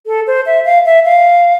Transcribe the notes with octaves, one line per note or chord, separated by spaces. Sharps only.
A4
C5
E5
F5
E5
F5